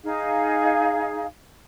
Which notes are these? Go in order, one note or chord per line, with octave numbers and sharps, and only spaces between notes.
D#4 G#4 F5